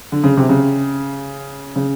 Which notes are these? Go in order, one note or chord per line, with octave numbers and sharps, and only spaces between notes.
D3
C#3
C3
C#3
C#3